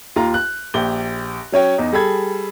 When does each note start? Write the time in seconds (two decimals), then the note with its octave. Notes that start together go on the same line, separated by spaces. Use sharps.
0.16 D#2 F4 A#5
0.34 F#6
0.74 A#1 G4 G7
1.52 F#3 C#4 C#5 G5
1.78 E2 D#4
1.93 G3 G#4 A4 B5 G#6